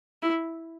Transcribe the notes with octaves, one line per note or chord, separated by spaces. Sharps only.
E4